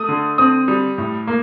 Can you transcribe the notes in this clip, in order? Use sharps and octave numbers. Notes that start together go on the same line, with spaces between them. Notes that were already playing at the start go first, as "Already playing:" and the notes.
Already playing: A3 D#6
D3
C4 D#6
G3
A2
A#3